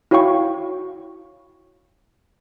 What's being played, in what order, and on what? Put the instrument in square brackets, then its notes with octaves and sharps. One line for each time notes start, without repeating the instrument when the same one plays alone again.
[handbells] E4 F#4 C#5 F5 G5 C#6